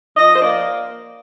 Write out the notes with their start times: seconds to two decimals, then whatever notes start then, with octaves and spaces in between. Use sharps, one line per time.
0.16 F3 D#5
0.35 C5
0.40 A#3 D5